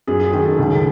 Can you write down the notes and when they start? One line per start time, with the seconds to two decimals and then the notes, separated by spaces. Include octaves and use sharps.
0.07 F#2 G#4
0.20 G#4
0.32 D#3 G#4
0.45 A4
0.59 C#2